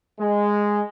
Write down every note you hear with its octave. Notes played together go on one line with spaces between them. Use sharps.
G#3